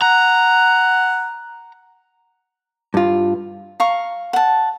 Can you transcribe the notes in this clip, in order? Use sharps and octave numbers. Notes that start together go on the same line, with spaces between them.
F#5 A#5
G2 F4
F5 A#5 C#6
F#5 A5